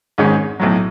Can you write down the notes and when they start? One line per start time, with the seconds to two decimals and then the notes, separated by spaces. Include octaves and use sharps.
0.18 G#1 G#2 D#3 G#3 C#4
0.60 B1 A2 F#3